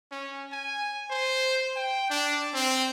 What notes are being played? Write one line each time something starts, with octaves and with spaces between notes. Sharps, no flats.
C#4
G#5
C5
G5
D4
C4